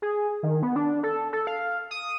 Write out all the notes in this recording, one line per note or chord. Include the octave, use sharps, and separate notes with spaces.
G#4
D#3
B3
D4
A4
A4
F5
D#6